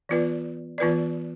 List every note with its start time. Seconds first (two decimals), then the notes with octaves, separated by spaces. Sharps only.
0.09 E3 B3 F4 B4 D5
0.78 E3 B3 F4 B4 D5